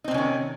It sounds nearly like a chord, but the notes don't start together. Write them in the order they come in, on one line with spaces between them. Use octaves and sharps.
D#4 C4 C3 C#4 D#3